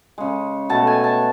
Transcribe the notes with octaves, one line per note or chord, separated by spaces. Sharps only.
C#3 G#3
B2 A3 A5
G#5
A5